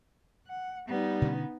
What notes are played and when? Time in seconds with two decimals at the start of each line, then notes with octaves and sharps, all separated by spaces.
0.47 F#5
0.88 G3 B3 D#4
1.22 B2 D3 C#4